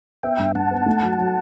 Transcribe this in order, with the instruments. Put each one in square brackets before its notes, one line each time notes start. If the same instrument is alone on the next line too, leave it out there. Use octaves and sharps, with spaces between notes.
[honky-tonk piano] B3 [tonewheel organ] E5 G5
[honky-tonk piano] G2
[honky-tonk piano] G2 [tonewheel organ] F#5 A5
[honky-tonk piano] B3
A3
F#3
F#3